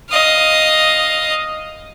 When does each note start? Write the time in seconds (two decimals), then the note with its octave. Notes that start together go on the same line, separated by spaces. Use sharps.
0.10 D#5 F5